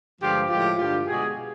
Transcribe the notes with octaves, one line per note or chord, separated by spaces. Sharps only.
G2 D3 F3 G#3 F4 G4
A2 F3 G#3 F4 G4
G2 D3 G3 F4 G4
B2 G#3 F#4 G#4